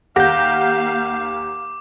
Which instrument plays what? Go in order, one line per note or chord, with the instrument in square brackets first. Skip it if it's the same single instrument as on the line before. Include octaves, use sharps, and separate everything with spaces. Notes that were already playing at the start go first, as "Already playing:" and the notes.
[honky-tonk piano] D#2 G4 A#6 [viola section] A#3 F5 [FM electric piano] F#5 G6 [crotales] D6